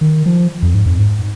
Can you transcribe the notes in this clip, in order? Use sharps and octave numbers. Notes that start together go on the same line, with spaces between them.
D#3
F3
F2
G#2
F2
G#2